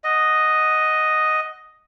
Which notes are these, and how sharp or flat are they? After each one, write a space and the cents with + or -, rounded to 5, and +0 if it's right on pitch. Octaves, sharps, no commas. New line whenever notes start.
D#5 +0 F#5 +0